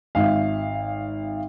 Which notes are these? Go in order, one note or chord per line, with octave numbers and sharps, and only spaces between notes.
G#1 E5 F5